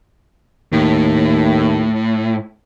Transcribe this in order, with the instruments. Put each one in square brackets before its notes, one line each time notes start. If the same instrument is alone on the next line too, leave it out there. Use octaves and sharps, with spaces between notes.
[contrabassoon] D#2 [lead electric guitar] A2